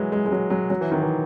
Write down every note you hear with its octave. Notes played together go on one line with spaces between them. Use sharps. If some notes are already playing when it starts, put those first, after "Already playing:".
Already playing: E3 F#3 G#3
G#3
G#3
F#3
F#3
F#3
E3
D#3
E3